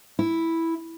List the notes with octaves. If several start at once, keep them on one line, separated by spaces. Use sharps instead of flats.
E4